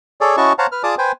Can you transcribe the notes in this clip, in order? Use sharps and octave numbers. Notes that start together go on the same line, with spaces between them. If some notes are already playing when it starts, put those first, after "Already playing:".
G#4 A4 C#5 D5
C#4 E4 F#4 D#5 A5 C#6
C5 C#5 F5 F#5 A5 A#5
B4 F6
F4 G#4 D5 A5 D6 D#6
B4 C5 G5 G#5